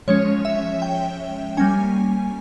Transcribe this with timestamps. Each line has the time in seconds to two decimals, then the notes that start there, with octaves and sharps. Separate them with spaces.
0.08 F3 G#3 C#4 C#5
0.45 E5
0.82 G5
1.57 G3 A#3 C#4 G#5